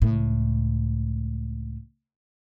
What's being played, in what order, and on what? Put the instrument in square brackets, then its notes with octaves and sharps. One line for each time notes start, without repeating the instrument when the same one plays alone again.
[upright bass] C#2 A2